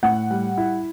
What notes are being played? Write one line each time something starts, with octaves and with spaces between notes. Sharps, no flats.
A2 F#5
G3
E4